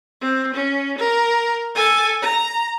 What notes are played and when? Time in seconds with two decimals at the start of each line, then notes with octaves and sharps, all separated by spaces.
0.21 C4
0.55 C#4
0.99 A#4
1.75 A4 G#5
2.22 A#5